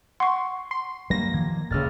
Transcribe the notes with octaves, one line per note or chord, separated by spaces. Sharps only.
F#5 C6 C#6
C6
G2 F#3 G3 A#3 A#6
D#3 F3 A#3 G#6
D#1 C#2 F6 A6